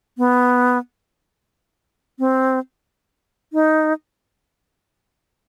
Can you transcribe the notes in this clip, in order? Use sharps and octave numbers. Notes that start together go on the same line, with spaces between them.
B3
C4
D#4